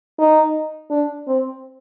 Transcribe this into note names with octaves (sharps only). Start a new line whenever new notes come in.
D#4
D4
C4